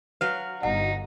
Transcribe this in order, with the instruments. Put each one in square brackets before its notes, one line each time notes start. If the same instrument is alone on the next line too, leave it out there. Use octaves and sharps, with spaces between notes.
[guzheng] F#3 F5 [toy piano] B4
[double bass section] G1 [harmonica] D#4 [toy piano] F#5